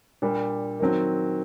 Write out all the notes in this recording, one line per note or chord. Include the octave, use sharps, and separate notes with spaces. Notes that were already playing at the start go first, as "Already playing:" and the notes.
A#2 G3 D4
D#3 F#3 C4